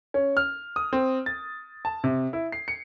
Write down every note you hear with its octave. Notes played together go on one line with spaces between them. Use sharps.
C#4
F6
D#6
C4
A6
A5
C3
E4
C7
C#7